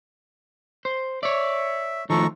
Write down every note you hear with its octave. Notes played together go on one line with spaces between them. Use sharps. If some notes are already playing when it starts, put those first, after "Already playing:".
C5
C#5 D5 E5
D#3 F3 A3 A4 A#5 C#6